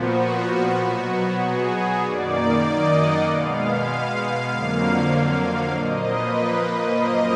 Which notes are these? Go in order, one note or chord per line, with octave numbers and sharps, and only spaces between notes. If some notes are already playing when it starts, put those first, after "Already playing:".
Already playing: A#2 F3 B3 F#4
B2 F#3 B3
G#4
F#2 D#3 A#3 D5
D#5
F#5
B2 G#3 B3 F5
F5
F2 D3 F#3 A#3 F5
F5
A#2 F3 A#3 D#5
B4
F#2 F3 A#3 D#5